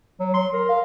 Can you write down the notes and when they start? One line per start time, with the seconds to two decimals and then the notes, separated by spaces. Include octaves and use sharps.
0.20 F#3
0.34 C6
0.53 A#4
0.69 F5